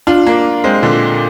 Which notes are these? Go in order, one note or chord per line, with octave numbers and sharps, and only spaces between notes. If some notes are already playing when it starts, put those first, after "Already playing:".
D4 F4
A#3 D4
G#3 C4
A#2 D3